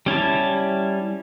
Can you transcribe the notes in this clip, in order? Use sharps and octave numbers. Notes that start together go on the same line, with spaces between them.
G3 C#4 E4 A5